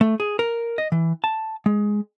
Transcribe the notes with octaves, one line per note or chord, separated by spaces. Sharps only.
A3
G#4
A#4
D#5
E3
A5
G#3